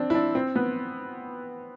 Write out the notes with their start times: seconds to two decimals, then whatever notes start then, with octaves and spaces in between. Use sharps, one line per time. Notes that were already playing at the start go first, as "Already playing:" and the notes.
Already playing: C4 D4
0.10 E4
0.15 D4
0.35 C4
0.56 B3